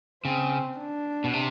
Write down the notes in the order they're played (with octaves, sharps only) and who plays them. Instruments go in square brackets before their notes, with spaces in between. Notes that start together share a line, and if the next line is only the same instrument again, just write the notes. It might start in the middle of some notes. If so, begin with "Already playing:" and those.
[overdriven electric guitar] C#3 [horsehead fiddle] C4
[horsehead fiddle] D4
[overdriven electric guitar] B2
C3